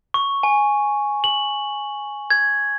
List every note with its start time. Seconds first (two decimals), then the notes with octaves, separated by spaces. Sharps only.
0.14 C#6
0.43 G#5
1.24 F#7
2.30 G#6